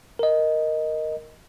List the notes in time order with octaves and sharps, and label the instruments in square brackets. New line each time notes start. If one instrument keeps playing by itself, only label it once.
[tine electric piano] A#4 D#5